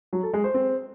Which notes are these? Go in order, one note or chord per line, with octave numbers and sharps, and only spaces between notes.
F#3
A4
G#3
C5
C4